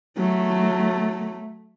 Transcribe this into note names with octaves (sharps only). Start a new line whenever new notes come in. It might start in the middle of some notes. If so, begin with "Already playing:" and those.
F#3 A3